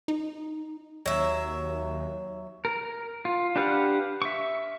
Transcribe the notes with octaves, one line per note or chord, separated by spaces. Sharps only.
D#4
D#2 F#3 E5
A#4
F4
D4 G4 B4 F5 F#5
E5 C#6